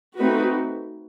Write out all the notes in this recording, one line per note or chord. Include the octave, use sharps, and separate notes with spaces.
A3 C4 D#4 F#4 B4